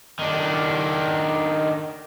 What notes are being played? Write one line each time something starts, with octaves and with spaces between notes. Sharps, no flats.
D#3 D4